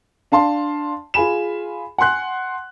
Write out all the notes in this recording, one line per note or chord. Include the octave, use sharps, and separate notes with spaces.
D4 F5 A5 C6
F4 G#4 G#5 B5 E7
F#5 G#5 C6 F#6